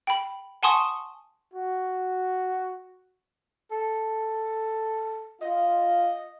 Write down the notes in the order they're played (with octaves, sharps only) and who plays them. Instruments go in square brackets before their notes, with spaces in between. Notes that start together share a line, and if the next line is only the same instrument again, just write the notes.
[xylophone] G5 B5
F#5 G#5 A5 C6 C#6 D#6
[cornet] F#4
[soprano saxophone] A4
[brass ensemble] F4 F5 [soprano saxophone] D#5